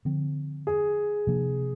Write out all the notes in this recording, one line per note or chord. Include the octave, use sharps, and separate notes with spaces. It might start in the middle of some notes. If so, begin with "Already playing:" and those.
D3 F3 C4
G#4
C3 F3 A#3 D4